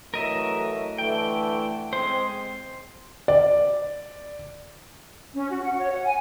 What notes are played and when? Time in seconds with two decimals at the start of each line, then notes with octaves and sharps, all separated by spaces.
0.14 E3 F#3 A3 A#4 D#5 E5
0.98 D3 E3 A3 G5
1.93 G#3 C4 C5
3.28 D5
5.35 C#4
5.49 F#4
5.63 F#5
5.78 C#5
5.90 F#5
6.04 G#5